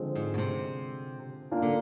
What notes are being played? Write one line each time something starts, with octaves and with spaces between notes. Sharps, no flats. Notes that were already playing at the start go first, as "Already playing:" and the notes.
Already playing: D3 F3 G#3 C4
G#2
B2
C3
A#3 D4 F4
D3